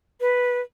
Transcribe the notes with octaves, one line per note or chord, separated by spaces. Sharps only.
B4